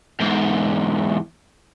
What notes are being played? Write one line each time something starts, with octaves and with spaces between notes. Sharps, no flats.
E2 G#2